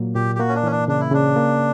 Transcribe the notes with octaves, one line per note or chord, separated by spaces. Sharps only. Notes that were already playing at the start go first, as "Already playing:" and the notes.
Already playing: A#2 F#3 A#3
A#2 G4
G4
A#3 F#4
C#4
D4
E3 C#4
D4
C#3 D4
E4
C#3 D4
A#3